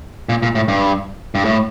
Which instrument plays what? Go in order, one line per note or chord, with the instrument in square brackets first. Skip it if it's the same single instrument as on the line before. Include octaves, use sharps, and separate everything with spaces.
[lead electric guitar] A#2
A#2
A2
G2
G2
A2